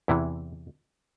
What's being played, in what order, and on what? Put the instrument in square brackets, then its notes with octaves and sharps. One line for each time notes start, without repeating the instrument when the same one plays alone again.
[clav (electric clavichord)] E2 C3 E3 E4